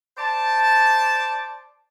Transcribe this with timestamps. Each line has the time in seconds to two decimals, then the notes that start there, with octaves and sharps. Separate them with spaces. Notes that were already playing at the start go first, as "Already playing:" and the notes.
0.17 C5 D5 A5